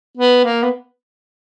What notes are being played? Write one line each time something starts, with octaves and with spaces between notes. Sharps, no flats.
B3
A#3
B3